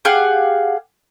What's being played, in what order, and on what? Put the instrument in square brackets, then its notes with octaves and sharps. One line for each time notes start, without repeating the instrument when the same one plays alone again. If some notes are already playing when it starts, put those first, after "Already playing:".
[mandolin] G4 G#4 F5 F#5